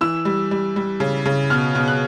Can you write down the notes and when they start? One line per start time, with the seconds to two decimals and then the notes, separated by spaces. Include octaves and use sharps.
0.01 E3 E6
0.25 G3
0.51 G3
0.76 G3
1.00 C#3
1.25 C#3
1.50 B2 F6
1.75 B2
1.88 F#6